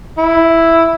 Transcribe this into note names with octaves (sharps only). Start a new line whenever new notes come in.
E4